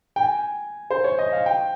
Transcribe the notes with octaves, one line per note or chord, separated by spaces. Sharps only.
G5
G#5
C5
C#5
D#5
F5
G5